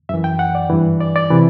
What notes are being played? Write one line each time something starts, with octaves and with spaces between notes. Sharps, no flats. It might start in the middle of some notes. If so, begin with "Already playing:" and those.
F#2 E3 E5
G5
F#5
D5
G2 E3
D5
D5
C3 E3